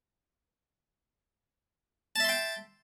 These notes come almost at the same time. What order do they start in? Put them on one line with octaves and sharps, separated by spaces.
A5 E5 C6 G5